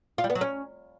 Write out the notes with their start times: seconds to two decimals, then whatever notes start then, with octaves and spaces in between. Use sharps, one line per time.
0.18 F4
0.24 G3
0.30 B3
0.35 F#3
0.41 C#4